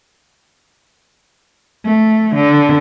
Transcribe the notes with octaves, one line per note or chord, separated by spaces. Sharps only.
A3
D3